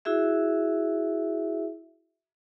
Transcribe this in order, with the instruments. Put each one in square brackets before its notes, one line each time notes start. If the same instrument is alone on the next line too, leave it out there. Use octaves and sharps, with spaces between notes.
[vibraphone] E4 F#4 G#4 E5